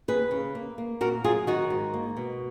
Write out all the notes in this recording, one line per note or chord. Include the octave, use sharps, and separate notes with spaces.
D#2 G#4 B4
C#3
A#3
A#3
A#2 F#4 A#4
F#3 F4 G#4
D#3 D#4 F#4
G#2
A#3
B2